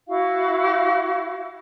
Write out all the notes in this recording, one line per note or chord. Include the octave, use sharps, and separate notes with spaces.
E4 F#4 F5